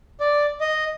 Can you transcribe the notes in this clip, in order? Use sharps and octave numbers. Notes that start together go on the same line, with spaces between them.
D5
D#5